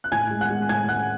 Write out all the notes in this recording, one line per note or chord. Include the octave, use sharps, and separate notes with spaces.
F#6
A2 G#5 G#6
G#3
F#5 F#6
G#3
A2 G#5 G#6
G#3 F#5 F#6